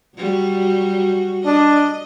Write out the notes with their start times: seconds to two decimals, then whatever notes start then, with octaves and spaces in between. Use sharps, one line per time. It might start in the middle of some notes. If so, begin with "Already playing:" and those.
0.15 F#3 G3 F#4
1.46 D4 D#5